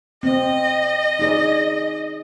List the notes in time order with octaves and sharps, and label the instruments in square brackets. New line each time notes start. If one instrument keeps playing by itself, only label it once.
[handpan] C4 [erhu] D#5
[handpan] D#4 G#4 D5